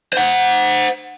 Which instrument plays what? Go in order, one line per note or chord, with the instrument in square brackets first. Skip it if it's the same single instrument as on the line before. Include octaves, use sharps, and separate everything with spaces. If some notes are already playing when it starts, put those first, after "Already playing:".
[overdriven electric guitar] C5 F#5